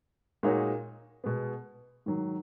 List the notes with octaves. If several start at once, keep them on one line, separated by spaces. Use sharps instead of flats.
A#2 G#3 D#4 F#4 C#5
B2 G#3 B3
G#2 D#3 F#3